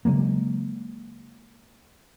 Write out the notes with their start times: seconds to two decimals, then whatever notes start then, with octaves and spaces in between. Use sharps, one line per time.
0.05 C#3 F#3 G#3 A#3